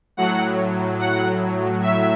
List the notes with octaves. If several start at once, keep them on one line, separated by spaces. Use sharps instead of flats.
A2 F#3 F#5
F#5
E5